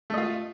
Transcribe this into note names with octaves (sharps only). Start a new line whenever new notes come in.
A3 F4 D#5